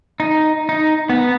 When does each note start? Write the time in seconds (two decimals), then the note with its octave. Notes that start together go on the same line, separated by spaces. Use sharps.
0.20 D#4
0.69 D#4
1.09 B3